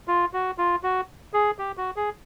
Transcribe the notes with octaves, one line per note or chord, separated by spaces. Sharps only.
F4
F#4
F4
F#4
G#4
G4
F#4
G#4